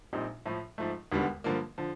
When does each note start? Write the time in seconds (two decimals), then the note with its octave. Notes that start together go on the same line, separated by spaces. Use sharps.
0.13 A#1 A#2 G3 C4 D#4
0.46 A2 F3 A3
0.78 G#2 F3 A3
1.12 E1 D#2 D3 G3 B3
1.44 G2 D3 F3 A#3
1.78 D3 F3